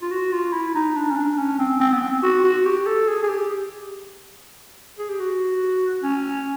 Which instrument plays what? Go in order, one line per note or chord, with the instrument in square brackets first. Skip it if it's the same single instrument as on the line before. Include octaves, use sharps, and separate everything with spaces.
[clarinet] F4
F#4
F4
E4
D#4
D4
C#4
D4
C#4
C4
C4
B3
C4
F#4
F#4
G4
A4
G#4
G#4
G4
G#4
G4
F#4
C#4